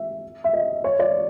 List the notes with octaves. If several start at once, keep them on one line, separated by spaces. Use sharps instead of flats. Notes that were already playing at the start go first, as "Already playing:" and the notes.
Already playing: E5
E5
D#5
C#5
D5